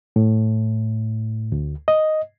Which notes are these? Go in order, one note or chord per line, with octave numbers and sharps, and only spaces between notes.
A2
D2
D#5